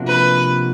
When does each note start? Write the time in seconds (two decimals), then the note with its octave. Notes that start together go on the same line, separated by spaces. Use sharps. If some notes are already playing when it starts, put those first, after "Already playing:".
Already playing: C3 F3 A#3 D4 F#4
0.08 B4